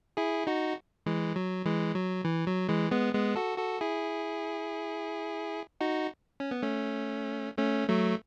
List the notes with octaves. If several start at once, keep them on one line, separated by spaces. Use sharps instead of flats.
E4 G#4
D#4 F#4
E3 G#3
F#3
E3 G#3
F#3
E3
F#3
E3 G#3
G#3 B3
G#3 B3
F#4 A4
F#4 A4
E4 G#4
D#4 F#4
C#4
B3
A3 C#4
A3 C#4
F#3 A3